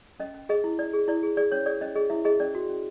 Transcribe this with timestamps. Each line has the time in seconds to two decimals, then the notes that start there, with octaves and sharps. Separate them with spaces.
0.20 C#4 D#5
0.34 C#4
0.49 G#4 D#5
0.64 E4
0.78 E4 D5
0.93 G#4
1.08 E4 D5
1.23 G#4
1.37 G#4 D5
1.51 C#4 C#5
1.66 G#4 D5
1.81 C#4 D#5
1.95 G#4 D#5
2.10 E4 E5
2.25 G#4 D#5
2.40 C#4 D5
2.55 F#4
2.69 C#4